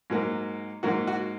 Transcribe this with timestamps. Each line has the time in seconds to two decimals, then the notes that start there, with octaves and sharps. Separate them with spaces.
0.10 G#2 F#3 A#3
0.83 G#2 F#3 A#3 F#4
1.07 F#4